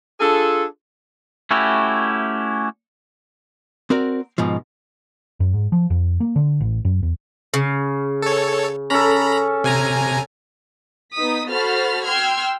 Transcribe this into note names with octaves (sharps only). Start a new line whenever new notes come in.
D4 F4 G#4 A4
A3 C#4 E4 F#4 G4
C4 F#4 A#4 D5
G#2 B2 F3
F#2
G#2
F3
F2
A#3
D3
A1
F#2
E2
C#3
A4 C#5
C#4 A4 A#5 B5
C3 G#5 A#5
B3 D#4 D#6 B6
F#4 A4 C5 B5 F6 A6
G5 C6 E6 F6 G#6